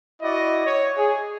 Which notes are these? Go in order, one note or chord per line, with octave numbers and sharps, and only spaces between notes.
E4 F#4 D5 D#5
C#5
G#4